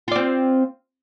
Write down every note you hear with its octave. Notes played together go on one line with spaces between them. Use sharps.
C4 F4 D5